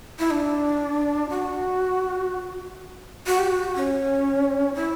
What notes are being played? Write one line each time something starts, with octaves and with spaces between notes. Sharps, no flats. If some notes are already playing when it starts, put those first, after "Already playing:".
E4
D4
F#4
F#4
G4
F#4
C#4
E4